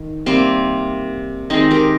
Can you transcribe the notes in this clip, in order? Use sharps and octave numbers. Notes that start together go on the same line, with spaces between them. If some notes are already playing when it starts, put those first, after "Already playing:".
Already playing: D#3
C3 G3 A#3 C4
D#3 G#3 C4 D#4
G4 A#4